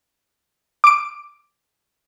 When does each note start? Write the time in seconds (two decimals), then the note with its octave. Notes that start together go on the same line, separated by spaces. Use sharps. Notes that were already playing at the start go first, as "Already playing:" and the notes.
0.84 D6 D7